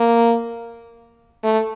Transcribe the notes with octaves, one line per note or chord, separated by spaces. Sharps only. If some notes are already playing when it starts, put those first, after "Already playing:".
Already playing: A#3
A3